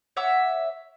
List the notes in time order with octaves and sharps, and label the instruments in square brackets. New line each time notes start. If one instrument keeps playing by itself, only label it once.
[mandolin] C#5 E5 F#5 D6